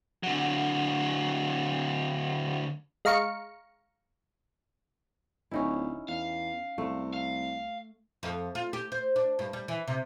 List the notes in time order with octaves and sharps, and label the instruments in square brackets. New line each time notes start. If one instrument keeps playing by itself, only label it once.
[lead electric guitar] D3 F#3
[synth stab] G#3 F5 A#5 C#6 C#7
[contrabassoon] D1 [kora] C#4 D#4 E4
[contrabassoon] E2 [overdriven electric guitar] F5
[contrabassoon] C2 [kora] A3
[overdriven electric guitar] F5
[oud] F2
F4
G4
C5
D4
G2
G3
E3
C3